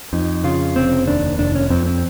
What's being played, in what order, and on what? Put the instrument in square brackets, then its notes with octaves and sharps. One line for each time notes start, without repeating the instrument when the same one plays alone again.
[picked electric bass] F2 [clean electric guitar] D#4
[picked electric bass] C#3 [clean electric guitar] F4
[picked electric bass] F1 [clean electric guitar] C4
[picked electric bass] D#2 [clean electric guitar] D4
[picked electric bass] F1 [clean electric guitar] D4
[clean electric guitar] C#4
[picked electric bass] F2 [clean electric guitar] C4
[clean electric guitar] C4